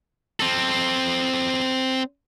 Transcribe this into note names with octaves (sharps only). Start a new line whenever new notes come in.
C4 A4